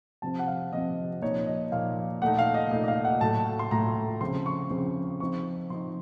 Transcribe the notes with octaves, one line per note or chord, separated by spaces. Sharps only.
C3 F3 C4 A5
F#5
F5
C3 F3 C4 D#5
A#2 F3 A#3 D#4 C#5
D#5
A#2 F3 A#3 D#4 F5
A#2 A3 D#4 F#5
F5
D#5
A#2 A3 D#4 D#5
D#5
F5
F#5
A2 F#3 A3 A5
C6
A2 F#3 A3 A#5
C#3 F3 C4 C6
C#6
C#3 F3 C4
F3 C4 D#4 C#6
F3 C4 D#4 C6